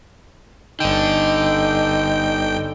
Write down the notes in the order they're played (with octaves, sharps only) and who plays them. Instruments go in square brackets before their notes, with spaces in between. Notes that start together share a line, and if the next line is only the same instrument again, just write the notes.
[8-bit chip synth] G1 G5 [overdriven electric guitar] D3 [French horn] D#4